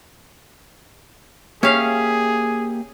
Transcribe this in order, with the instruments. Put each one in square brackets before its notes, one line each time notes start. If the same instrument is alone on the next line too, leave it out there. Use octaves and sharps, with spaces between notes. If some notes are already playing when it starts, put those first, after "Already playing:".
[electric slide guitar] A#3 G4 E5 [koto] C#4 F5 [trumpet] G#4